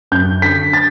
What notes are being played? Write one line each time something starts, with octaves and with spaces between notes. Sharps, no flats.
F#2 G6
D3 B6
A6